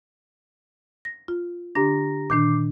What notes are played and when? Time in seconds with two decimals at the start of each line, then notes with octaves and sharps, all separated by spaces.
1.05 A#6
1.28 F4
1.75 D3 D4 G4 A#5 A#6
2.30 A#2 D#3 D4 D6 G6 C7